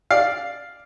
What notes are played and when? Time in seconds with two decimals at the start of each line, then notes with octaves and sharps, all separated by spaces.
0.11 D5 F5